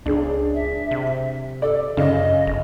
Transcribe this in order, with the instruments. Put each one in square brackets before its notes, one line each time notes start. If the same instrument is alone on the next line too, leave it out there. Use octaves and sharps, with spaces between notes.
[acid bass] C#2 [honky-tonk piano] D4 G#4
[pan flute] E5
[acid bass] C3
[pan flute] A4 [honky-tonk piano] D5
[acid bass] F#2 [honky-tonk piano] C#3 [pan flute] D#5
[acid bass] G1